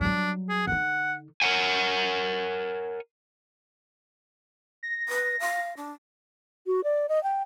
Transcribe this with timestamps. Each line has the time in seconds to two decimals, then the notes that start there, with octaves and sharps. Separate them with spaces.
0.01 F#3 G3 D4
0.49 G#4
0.67 D3 D#4 F#5
1.42 A#4 C#5 F#5 G#5
4.83 A#6
5.09 B4
5.40 F5
5.77 D4
6.67 F#4
6.84 D5
7.09 D#5
7.23 G5